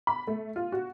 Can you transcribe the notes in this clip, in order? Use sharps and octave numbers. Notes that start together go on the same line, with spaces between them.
B5
A3
F4
F#4